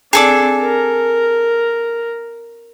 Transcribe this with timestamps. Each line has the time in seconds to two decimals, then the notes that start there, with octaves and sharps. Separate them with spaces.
0.13 C4 D4 G#4 A4 D6
0.61 A#4